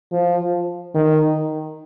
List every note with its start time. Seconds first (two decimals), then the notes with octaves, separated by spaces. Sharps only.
0.12 F3
0.95 D#3